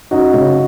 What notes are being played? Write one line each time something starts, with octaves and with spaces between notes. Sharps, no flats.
F#2 D#4 F#4
C#3